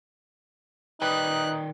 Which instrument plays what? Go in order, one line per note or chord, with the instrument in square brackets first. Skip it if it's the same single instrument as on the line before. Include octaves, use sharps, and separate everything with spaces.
[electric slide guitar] D#3 D5 G5 [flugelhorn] D#4 [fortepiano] B4 D#6 [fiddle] F#6